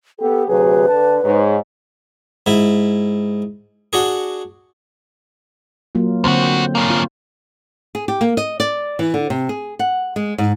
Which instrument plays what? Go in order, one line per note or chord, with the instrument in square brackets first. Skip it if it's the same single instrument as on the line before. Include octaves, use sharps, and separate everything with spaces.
[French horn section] B3 G4 [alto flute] A4
[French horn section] D2 C3 F#3 [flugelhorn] G#4 [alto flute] B4
[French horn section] D3 [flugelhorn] A5
[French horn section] G#2 [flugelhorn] C#5
[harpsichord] G#2 E4
D4 F#4 G#4
[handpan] F#3 A#3 F4
[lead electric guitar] D2 F#4 [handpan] D3 C4 C5
[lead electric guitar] A#3 C#4
[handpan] F4
[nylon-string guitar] G#4
G4
A#3
D#5
D5
E3
D3
C3
G#4
F#5
G#3
G#2